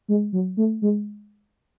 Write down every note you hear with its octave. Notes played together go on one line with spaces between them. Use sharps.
G#3
F#3
A3
G#3